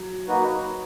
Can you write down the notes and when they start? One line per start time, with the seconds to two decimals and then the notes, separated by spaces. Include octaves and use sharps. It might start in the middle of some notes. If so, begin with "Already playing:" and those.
Already playing: F#3
0.28 A#3 D#4 F#4 B4